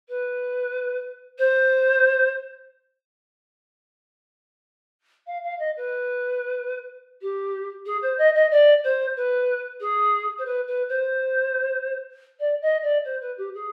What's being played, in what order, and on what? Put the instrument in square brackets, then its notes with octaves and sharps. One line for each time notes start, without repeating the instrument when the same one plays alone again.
[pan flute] B4
C5
F5
F5
D#5
B4
G4
G#4
C5
D#5
D#5
D5
C5
B4
G#4
C5
B4
B4
C5
D5
D#5
D5
C5
B4
G4
G#4